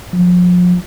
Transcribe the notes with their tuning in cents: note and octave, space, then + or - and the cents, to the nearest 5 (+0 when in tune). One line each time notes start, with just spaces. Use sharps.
F3 +35